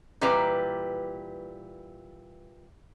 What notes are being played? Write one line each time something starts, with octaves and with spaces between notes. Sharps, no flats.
A#2 E3 G3 B4 D5 A#5